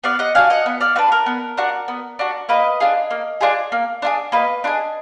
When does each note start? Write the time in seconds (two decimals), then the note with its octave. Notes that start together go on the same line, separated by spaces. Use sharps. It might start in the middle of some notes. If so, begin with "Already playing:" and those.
0.04 B3 D5 F5
0.19 D#5 F#5
0.35 D4 F#4 F5 G#5
0.50 D#5 F#5
0.66 B3
0.81 D5 F5
0.96 D4 F#4 B4
1.12 A#4
1.26 B3
1.57 D4 F#4
1.88 B3
2.19 D4 F#4
2.49 A#3 B4 D#5
2.80 D4 F4 G#4
3.11 A#3
3.41 D4 F4 G#4
3.72 A#3
4.02 D4 F4 G#4
4.32 A#3 B4 D#5
4.64 D4 F4 G#4